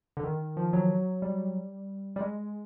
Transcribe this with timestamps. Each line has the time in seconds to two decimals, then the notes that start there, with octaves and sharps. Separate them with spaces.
0.17 D3
0.23 D#3
0.57 F3
0.73 F#3
1.22 G3
2.16 G3
2.21 G#3